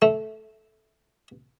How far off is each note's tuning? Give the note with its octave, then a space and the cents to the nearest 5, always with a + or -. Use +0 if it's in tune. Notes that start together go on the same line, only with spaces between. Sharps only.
A3 -10